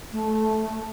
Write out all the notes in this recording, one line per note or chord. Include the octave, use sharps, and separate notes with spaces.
A3